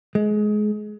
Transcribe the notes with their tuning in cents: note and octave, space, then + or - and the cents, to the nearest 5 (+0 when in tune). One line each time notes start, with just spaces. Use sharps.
G#3 +25